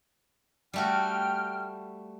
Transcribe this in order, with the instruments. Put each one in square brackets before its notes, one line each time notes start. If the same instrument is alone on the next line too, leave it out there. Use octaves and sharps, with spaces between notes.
[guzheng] G3 A3 F#4 [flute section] G5 F6